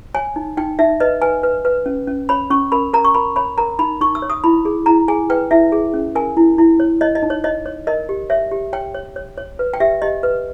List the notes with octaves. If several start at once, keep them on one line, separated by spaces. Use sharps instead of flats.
C#5 G#5
D#4
D#4 G5
D#4 E5
B4 D#5
B4 G#5
B4
B4
C#4
C#4
C#5 B5
C#4 C#6
A#4 B5
A#4 A#5
C#6
A#4 B5
C#5 B5
A#4 A#5
D#4 B5
D#4 C#6
E6
C#5
D#6
E4 B5
G#4
E4 A#5
G#4 G#5
B4 G5
E4 E5
G#4
C#4
A#4 G#5
E4
E4
C#5
C#5 D#5
D#5
D#4
C#5
C#5 D#5
C#5
A#4 D#5
G4
C#5 E5
G4
C#5 G5
C#5
C#5
C#5
B4
G5
G4 E5
G4 D#5
B4